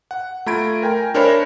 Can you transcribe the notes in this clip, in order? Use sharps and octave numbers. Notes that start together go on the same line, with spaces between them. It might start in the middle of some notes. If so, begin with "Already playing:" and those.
F#5
A3 F4 A#5 B5 G#6 D7
A#4 G5 G#5 A#5
D4 A#4 C5 C#5 E5 B5